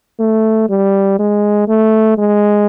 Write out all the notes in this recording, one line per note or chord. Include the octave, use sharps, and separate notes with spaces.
A3
G3
G#3
A3
G#3